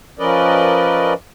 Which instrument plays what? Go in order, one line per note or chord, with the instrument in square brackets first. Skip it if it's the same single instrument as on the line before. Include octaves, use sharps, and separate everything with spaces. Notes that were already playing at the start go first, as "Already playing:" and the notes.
[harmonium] F3 C#4 A#4 B4 D5 D#5